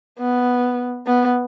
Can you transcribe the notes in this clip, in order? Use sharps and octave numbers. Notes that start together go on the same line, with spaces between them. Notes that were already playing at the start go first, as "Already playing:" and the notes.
B3
B3